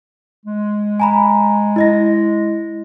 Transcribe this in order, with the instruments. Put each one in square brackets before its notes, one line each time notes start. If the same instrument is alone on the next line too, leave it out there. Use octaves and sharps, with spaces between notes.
[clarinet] G#3
[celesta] G#5 A#5 B5
E4 D#5 A#6